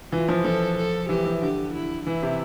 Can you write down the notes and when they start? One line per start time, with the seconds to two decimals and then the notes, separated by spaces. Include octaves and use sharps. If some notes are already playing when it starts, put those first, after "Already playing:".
0.12 E3 F4
0.29 F3
0.44 F3 A4
0.77 A4
1.09 E3 G4
1.25 E3
1.41 D3 G4
1.74 E4
2.06 E3 E4
2.23 C3